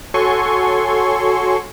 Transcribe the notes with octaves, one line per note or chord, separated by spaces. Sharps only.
F#4 A4 C#5 G#5 C6 C#6